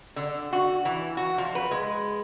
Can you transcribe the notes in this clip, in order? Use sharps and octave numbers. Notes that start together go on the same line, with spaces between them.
D3
F#4
E3
F#4
F3
B4
G#3